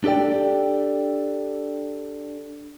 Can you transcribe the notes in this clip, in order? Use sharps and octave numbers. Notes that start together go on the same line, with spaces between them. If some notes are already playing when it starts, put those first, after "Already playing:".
D4 G4 A4 D5 G5